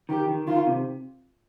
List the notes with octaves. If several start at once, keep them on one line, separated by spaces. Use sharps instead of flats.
D#3 G4
D#3
D#3 F4
C3